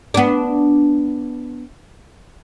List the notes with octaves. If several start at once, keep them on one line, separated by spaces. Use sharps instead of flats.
B3 D4